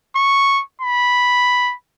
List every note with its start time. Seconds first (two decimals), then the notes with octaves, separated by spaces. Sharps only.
0.16 C#6
0.82 B5